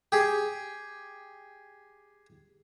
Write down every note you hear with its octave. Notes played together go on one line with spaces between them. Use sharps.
G4 G#4